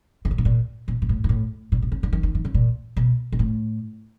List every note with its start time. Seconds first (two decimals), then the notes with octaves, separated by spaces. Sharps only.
0.25 C#3
0.31 C3
0.38 B2
0.45 A#2
0.88 A#2
1.02 A#2
1.09 A2
1.24 G#2
1.29 A2
1.72 A#2
1.82 B2
1.92 C#3
2.03 D3
2.13 D#3
2.23 D#3
2.35 D#3
2.45 C#3
2.54 A#2
2.97 B2
3.32 A#2
3.39 A2